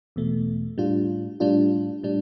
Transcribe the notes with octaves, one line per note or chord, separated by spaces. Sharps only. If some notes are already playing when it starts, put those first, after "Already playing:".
E2 B2 A3
A2 G3 D4 F4
A2 G3 D4 F4
A2 G3 D4